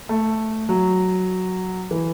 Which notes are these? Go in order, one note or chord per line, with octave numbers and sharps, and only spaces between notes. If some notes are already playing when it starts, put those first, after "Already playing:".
A3
F#3
E3